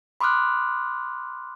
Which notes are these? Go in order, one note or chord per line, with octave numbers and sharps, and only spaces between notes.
B5 C6 D6 D#6 F6 F#6